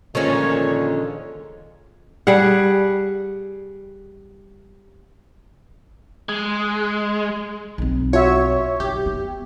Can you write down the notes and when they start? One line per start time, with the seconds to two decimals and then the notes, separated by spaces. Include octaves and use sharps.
0.15 A#2 D3 D#3 F3 G#3 C#4 C#5
2.27 G3 G#4 F#5
6.29 G#3
7.78 B1 C4
8.13 F4 F#4 C#5 E5
8.80 B1 G4
9.06 B3